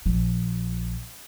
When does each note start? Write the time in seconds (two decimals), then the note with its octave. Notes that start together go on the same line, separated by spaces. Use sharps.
0.06 A#1 F3